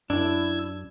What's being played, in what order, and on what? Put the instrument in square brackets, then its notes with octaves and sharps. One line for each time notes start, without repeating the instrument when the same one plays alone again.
[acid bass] F#2 [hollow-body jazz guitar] D4 [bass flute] E4 [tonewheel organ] E6 G#6